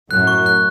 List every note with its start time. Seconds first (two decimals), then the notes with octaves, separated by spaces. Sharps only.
0.10 F#2 A2 F#6
0.27 C#6
0.46 F#6